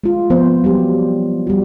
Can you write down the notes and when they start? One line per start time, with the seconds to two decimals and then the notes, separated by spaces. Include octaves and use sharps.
0.04 G#3 F4
0.30 F3 B3 C5
0.64 F#3 G3 G4
1.47 G3 F#4